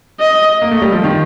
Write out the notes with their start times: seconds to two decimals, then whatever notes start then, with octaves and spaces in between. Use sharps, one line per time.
0.20 D#5
0.62 A#3
0.71 A3
0.82 G3
0.92 F3
1.04 D#3